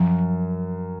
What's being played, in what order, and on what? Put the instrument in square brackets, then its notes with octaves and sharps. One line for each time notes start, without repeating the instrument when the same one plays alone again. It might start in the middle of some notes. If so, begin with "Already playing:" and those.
Already playing: [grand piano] F#2 [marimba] F3